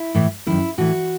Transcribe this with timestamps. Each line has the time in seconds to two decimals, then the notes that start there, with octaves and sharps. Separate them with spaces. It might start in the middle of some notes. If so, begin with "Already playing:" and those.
Already playing: E4
0.15 A2 E3
0.46 F#2 D#3 E4
0.78 A2 E3 F#4